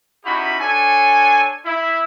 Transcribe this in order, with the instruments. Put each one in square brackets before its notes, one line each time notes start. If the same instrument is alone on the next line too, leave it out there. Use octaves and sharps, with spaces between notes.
[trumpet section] C#4 D#4 E4 F#4 G4 B5
D4 A4 C#5 G#5
E4